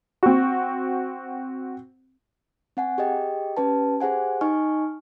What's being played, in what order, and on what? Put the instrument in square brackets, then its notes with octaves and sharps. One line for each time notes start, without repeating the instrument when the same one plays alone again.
[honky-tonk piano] C4 F#4
[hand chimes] C4 F#5 G#5
G4 G#4 D#5 G5
C#4 G4 B4 A5
G4 G#4 C5 F#5 G#5
D#4 D#5 G#5 C#6 F6